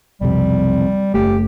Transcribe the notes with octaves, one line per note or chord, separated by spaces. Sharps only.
B1 F2 C3 G3
F#1 A3 G4